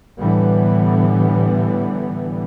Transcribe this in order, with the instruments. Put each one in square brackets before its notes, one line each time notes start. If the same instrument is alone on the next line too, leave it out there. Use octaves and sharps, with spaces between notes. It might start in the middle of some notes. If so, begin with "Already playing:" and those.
[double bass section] A2 D3 E3 G3 B3